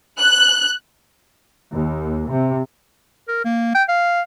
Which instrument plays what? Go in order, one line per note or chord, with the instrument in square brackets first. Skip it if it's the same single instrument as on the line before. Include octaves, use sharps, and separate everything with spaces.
[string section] F#6
[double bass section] D#2
C3
[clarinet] A#4
A#3
G5
F5